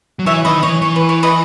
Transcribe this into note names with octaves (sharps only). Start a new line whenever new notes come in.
F#3
E3 C#5 E5
D#3 B4 D#5
E3 C#5
E3 C#5
B4
C#5
B4 D#5